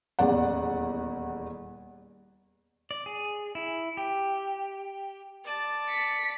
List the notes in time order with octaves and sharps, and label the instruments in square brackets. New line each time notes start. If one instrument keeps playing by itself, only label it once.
[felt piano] D#1 E2 D5 F#5
[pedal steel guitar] D5
G#4
E4
G4
[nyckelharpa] D5 A5
[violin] B6 C#7